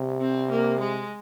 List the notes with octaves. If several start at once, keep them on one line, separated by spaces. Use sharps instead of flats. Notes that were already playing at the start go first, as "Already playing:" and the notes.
Already playing: C3
C4
A#3
G#3